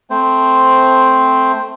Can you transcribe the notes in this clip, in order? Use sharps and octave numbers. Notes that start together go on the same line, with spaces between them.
A3 C4 C5